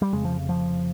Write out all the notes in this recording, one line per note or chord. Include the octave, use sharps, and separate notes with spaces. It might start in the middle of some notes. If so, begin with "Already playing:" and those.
G3
F1 F2 C#3 G#3
F3
F3